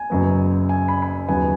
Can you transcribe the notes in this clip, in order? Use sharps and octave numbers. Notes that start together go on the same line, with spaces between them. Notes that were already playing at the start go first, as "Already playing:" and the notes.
Already playing: G#5
F#1 F#2 C#3 F#3 B3
G#5
B5
B5
G#5
D#2 C#3 F#3 B3 G#5